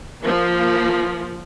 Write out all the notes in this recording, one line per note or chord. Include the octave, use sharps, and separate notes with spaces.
F3 A#3